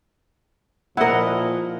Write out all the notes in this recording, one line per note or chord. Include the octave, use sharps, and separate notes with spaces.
A#2 F3 E4 A#4 D#5 F#5